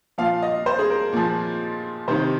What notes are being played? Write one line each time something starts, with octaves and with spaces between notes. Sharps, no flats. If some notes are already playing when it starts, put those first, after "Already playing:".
A#2 F3 F5
D#5
C5
G#4
A#4
A#2 F3
C3 D#3 C5